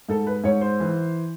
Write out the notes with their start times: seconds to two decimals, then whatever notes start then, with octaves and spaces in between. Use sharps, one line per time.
0.09 G#2 A4
0.27 B4
0.44 G#2 C#5
0.61 C5
0.80 E3